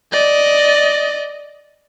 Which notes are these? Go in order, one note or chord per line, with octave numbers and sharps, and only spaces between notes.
D5 D#5